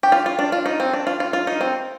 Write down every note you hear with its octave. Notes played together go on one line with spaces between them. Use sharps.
G4
F4
F4
D4
F4
D#4
C4
D4
F4
F4
F4
D#4
C4